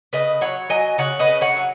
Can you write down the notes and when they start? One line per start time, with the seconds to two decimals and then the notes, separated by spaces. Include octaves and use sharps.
0.13 C#3 B4 D#5
0.41 F#3 C#5 F#5
0.70 F#3 D#5 G#5
0.98 C#3 C#5 F#5
1.19 B4 D#5
1.28 C#3
1.41 C#5 F#5
1.56 F#3